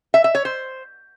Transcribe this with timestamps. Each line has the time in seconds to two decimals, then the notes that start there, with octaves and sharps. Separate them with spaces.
0.14 E5
0.24 E5
0.35 C#5
0.45 C5